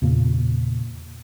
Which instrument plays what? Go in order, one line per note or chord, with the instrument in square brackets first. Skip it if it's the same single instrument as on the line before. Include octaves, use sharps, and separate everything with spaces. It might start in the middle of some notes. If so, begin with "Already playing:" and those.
[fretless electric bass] E2 A#2 C#3 A#3